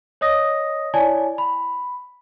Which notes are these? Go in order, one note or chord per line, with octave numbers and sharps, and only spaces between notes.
C#5 D#5 D#6 A#6
E4 C#5 D5 G#5 A5
B5